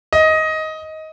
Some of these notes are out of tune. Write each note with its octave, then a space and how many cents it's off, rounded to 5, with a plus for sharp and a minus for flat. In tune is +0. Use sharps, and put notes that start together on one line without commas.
D#5 +15